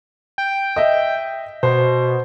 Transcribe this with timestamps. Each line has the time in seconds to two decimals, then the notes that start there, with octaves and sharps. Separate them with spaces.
0.38 G5
0.76 D#5 E5
1.63 B2 C5